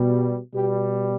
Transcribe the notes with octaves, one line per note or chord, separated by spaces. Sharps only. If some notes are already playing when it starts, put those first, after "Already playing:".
Already playing: B2 G3
B2 G3 G4